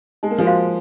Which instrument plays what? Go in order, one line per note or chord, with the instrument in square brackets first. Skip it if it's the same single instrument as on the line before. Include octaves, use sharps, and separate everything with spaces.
[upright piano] G#3 [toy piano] D#4
[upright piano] A#3
F3 G#3
[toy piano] F#4 C5 F5 C6